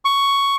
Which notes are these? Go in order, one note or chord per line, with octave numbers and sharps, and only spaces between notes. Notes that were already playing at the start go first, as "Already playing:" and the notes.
C#6